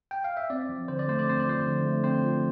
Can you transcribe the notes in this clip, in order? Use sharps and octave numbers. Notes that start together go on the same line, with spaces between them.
G5
F5
E5
C4 D5
F3
D3 C5
D5
A3 C5
D5
C4 C5
D5
F3 C5
D3
A3
C4 C5
F3